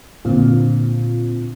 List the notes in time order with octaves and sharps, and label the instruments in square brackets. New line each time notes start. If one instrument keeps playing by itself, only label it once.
[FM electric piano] A#2 D3 C4 F4